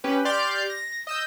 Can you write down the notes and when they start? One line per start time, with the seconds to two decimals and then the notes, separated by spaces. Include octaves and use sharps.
0.04 C#4 G4 B4
0.25 G4 D5 C6 D6 F6 G6
0.70 A#6
1.07 D#5 E6 G6